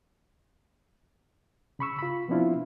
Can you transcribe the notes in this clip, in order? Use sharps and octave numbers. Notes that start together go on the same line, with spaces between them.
C#3 B5 C#6 E6
F4 B5
F3 B3 C4 D4 E4 F4